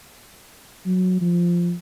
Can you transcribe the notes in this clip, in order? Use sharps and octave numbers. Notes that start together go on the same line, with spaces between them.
F#3
F3